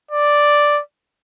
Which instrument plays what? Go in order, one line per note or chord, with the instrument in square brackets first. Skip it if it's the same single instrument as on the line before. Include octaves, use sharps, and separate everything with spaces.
[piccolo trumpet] D5